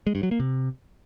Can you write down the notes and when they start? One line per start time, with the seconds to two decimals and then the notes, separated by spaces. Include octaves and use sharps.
0.07 G#3
0.15 G2
0.23 F#3
0.31 A#3
0.40 C3